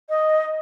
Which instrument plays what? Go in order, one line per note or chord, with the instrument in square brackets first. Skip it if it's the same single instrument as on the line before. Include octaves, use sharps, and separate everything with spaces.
[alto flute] D#5